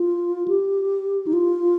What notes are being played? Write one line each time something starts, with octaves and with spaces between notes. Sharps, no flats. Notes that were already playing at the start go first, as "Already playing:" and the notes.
Already playing: F4
G4
D#4
F4